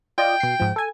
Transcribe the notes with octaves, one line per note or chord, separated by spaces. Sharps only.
F4 D5 D#5 G5
B2 C7
G#2 F3
A4 G#5